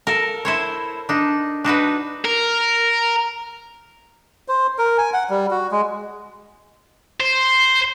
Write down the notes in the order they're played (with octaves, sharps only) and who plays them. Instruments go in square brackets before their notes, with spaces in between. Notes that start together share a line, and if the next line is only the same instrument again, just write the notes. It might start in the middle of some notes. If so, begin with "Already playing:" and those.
[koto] A4 A#4
E4 C5 C#5
D4 D#4
D4 D#4 F#4 B4
[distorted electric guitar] A#4
[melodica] C5
A#4
G#5
F#5
G3
F#4
G#3
[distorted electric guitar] C5